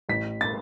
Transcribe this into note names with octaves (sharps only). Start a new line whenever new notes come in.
A1 B6
A6